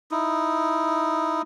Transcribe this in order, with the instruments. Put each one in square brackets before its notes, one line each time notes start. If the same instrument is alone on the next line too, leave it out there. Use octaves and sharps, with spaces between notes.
[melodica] D#4 E4